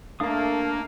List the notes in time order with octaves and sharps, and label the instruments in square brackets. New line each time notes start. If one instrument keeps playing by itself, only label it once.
[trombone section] A3 A#3 [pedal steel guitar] D4 F5 D#6